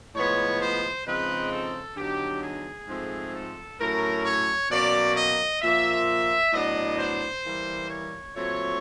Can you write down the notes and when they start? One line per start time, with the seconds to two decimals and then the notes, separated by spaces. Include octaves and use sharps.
0.14 A2 F3 G#3 B3 C#5
0.60 C5
1.06 C#3 F3 G#3 C4 D#4 B4
1.51 A4
1.97 D3 F#3 B3 D#4 G4
2.42 G#4
2.87 G#2 F3 A3 C4
3.34 A4
3.79 A2 F#3 A3 C#4 A#4
4.24 C#5
4.70 B2 F#3 A#3 C#4 D5
5.16 D#5
5.62 A#2 F3 A#3 E5
6.53 A2 F#3 B3 D4 D#5
6.99 C5
7.44 E3 G3 A#3
7.90 C#5
8.35 A#2 F#3 A3 C4 C#5